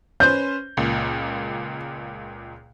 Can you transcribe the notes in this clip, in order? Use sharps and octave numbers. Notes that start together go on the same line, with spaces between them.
C#4 B4 C5 G6
C#2 A#2